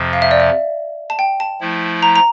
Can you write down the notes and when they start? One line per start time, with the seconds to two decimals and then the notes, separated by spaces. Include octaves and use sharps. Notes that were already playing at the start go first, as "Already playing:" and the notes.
Already playing: F2 C3 F3
0.13 F5
0.22 E5
0.31 D5
0.40 E5
1.10 A5
1.19 G5
1.40 A5
1.61 F3 A3 E4
2.03 A#5
2.16 A#5